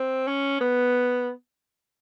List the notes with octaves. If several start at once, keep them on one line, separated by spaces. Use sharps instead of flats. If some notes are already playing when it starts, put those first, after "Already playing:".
Already playing: C4
C#4
B3